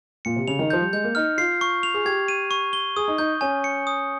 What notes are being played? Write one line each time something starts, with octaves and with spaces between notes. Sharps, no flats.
A#2 C#7
C3
C#3 F7
D#3
F3 G6
G3
G#3 G6
A#3
D#4 F6
F4 C7
C#6
F7
G#4
G4 G#6
D#7
C#6
G7
G#4 D#6
D#4
D#4 G6
C#4 G#5
C#7
D#6